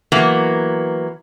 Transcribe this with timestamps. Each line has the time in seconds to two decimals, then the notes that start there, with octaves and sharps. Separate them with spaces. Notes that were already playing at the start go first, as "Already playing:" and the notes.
0.12 E3 F#3 A#3 B3